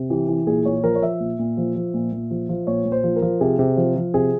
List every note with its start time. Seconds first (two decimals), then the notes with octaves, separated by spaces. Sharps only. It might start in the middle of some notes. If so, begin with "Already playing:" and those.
Already playing: C3
0.10 E3 G4
0.28 E3
0.47 A#2 G#4
0.65 A#2 C#5
0.84 F3 A#4
0.95 C#5
1.02 F3 E5
1.20 A#2
1.39 A#2
1.57 F3
1.75 F3
1.94 A#2
2.12 A#2
2.31 F3
2.49 F3
2.67 A#2 C#5
2.85 A#2
2.92 C5
3.04 F3
3.16 A#4
3.22 F3
3.41 C3 G#4
3.59 C3
3.77 F3
3.96 F3
4.14 C3 G#4